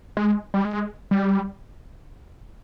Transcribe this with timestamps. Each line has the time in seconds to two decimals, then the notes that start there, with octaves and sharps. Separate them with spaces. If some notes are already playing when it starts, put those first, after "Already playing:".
0.17 G#3
0.54 G3
0.65 G#3
1.11 G3